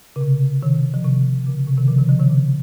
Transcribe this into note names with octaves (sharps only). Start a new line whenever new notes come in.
C#3
C3
C3 D#3
F3
C3 D#3
C#3
C3
C3 D#3
C#3 F3
C3 D#3
C#3 F3
C3 D#3
C#3